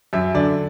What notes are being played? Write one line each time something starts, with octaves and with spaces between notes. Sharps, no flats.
F#2 E5
D3 D5